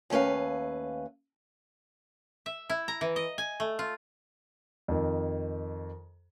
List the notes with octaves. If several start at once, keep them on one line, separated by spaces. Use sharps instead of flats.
D#2 A3 C#4 B4 F5
E5
E4
A#5
E3
D#5
G#5
A3
F4
F2 D#3